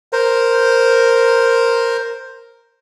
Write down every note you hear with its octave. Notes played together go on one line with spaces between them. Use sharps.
A#4 C5